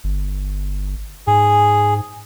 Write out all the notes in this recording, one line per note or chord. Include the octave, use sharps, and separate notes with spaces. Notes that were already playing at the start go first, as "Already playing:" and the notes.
G1
G#2 G#4